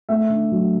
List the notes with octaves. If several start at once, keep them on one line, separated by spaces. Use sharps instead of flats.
A3 E5
D3
F#3